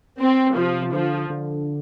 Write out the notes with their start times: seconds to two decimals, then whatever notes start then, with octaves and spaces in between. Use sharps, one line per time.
0.19 C4
0.56 C3 F3
0.92 D3 F3
1.30 D3